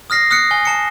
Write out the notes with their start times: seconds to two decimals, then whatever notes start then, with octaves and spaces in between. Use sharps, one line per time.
0.10 D#6 F6 A#6 C7
0.31 D#6 F6 F#6 C7 C#7
0.51 G#5 G7
0.65 A5 C#7